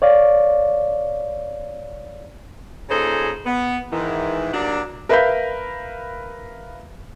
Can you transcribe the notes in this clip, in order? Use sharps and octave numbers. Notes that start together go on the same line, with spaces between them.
C#5 D5 F5
A#2 C#3 D#4 G#4 A4 C5
B3
G#2 D#3 E3
F#3 G3 A#3 D4
A#4 B4 E5 F5 B5 G6